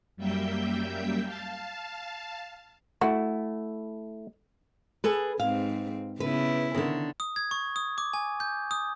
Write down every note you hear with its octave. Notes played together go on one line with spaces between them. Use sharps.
F#2 G3 A#3 E5 G5 G6
F5 A5
A3 E4 F#4
G#4 A4 B4
G#2 C4 F5
C#3 B3 E4 B4
D3 D#3
D#6
G#6
C#6
D#6
D6
G#5
G6
D#6